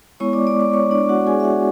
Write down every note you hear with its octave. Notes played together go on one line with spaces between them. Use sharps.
G#3 B3 E4 C#5 C#6
D5 D6
D5 D6
D5 D6
C#5 C#6
D4 D5
F#4 F#5
G#4 G#5
E5
F#4 F#5